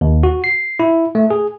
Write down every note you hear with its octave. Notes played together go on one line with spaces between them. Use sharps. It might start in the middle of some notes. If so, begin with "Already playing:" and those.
D#2
F#4
C7
E4
A3
G#4